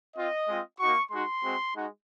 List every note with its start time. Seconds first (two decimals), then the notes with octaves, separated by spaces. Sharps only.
0.16 C4 F4 D#5
0.48 G#3 C4 F4
0.79 A#3 D#4 F#4 C#6
1.11 G#3 D#4 F#4 C6
1.43 G#3 C4 F#4
1.74 G#3 D#4 F#4